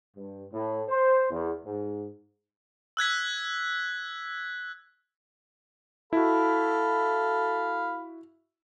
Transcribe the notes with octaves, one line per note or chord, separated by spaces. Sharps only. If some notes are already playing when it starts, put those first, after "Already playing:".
G2
A2
C5
E2
G#2
E6 F#6 G#6 B6
E4 F#4 A4 F5 B5